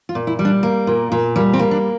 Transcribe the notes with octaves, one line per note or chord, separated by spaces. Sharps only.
F4
A#2
E4
G3
D4
A#3
A#2
A#2
G3 A#3
C4
A#3
D4